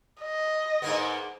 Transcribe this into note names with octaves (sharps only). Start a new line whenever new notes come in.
D#5
G#2 A#3 B3